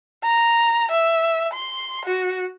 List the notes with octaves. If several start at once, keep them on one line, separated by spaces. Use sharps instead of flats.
A#5
E5
C6
F#4